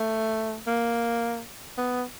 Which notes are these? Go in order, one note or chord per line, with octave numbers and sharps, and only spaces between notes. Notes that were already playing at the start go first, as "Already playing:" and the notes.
Already playing: A3
A#3
B3